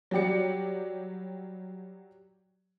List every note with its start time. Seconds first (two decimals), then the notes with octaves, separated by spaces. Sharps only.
0.11 F#3 G3 G4 D5 C#7